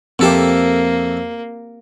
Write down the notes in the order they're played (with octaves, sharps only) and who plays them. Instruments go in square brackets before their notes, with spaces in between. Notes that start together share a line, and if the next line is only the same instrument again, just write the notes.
[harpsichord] F2 A4 E5 [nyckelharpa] A#3 [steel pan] C4 G4